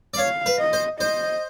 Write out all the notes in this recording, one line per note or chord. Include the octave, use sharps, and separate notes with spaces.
D5
C#5 F5
B4
D#5
C5
C5 D#5